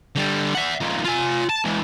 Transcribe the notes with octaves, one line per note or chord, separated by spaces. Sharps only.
D3 G3
E5 F#5
F3 D#4
F4 G#5
A5
E3 G#3